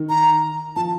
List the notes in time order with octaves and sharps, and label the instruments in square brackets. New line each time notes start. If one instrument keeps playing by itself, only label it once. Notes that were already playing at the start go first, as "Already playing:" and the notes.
Already playing: [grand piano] D#3
[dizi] A#5
[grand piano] F3 [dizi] A5